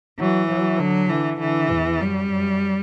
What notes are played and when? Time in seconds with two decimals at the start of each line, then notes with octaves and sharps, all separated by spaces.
0.19 E3 F#3
0.49 F#3
0.80 D3 F#3
1.09 D3 E3
1.40 D3 E3
1.71 E2
2.00 F#2 G3
2.32 F#2